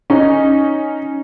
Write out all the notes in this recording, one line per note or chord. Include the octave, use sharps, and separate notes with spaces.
C#4 D#4